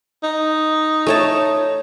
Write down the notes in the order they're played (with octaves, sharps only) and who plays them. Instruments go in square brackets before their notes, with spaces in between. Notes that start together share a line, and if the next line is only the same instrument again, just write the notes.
[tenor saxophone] D#4
[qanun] A3 C#5 A5